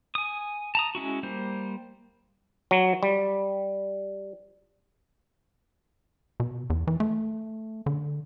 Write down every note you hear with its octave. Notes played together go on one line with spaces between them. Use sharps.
G#5 D#6
A5 A#5 D#6
G#3 C#4 E4 F#4
G3 A#3 C5
F#3
G3
B2
E2
E3
A3
D3